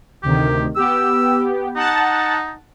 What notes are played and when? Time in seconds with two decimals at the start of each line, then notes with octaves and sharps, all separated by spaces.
0.23 D2 C3 D#3 G4
0.76 B3 G4 E6
1.76 D#4 F#5 A5 A6